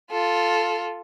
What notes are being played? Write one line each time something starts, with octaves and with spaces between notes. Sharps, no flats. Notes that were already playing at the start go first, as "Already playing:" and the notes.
F4 A4